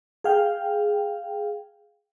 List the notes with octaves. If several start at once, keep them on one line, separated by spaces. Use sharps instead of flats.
G#4 F5 G5